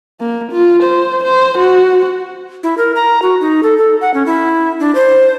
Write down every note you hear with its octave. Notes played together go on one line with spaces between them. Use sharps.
A#3
F4
C5
C5
F#4
E4
A#4
A#5
F#4
D#4
A4
A4
F#5
C#4
E4
D4
C5